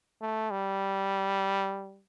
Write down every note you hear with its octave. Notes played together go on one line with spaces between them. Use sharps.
A3
G3